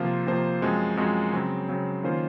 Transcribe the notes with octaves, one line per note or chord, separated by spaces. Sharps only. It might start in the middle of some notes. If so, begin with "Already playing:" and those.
Already playing: C3 F3 A#3 F4 C5
C3 F3 A#3 F4 C5
F#2 F3 G#3 C4 F#4
F#2 F3 G#3 C4 F#4
C#3 F#3 C4
C#3 F#3 C4
D#3 A#3 C#4 F4 C5